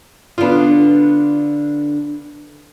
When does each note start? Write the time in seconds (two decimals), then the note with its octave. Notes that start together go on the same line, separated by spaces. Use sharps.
0.38 D3 B3 D4 F4